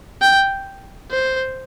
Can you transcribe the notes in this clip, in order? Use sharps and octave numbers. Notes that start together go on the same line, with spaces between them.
G5
C5